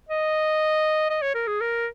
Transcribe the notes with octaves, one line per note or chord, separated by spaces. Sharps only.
D#5
D#5
C#5
A#4
G#4
A#4